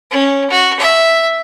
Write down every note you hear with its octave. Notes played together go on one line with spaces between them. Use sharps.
C#4
F#4
E5